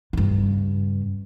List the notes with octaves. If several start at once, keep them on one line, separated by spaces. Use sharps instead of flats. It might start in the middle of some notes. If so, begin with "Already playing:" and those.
G2 C#3